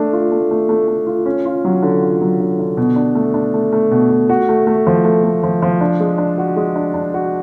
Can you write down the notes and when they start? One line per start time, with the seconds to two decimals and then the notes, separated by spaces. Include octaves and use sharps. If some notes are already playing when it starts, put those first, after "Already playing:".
Already playing: A3 D4
0.13 F4
0.32 A3
0.51 A3
0.69 A3
0.88 A3
1.07 F4
1.26 C#4
1.45 F4
1.65 F#3
1.82 D3
2.02 F4
2.21 F#3
2.40 D3
2.59 D3
2.77 B2
2.96 D4
3.15 A3
3.34 D4
3.54 A3
3.72 A3
3.91 B2
4.10 A3
4.29 F#4
4.49 A3
4.67 A3
4.87 F3
5.05 A3
5.23 A3
5.44 F3
5.62 F3
5.81 D4
6.00 G#3
6.18 D4
6.38 F#4
6.56 G#3
6.76 D4
6.94 D4
7.14 F#4